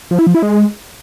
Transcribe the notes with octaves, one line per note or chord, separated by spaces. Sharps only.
F3
E4
F3
E4
G#3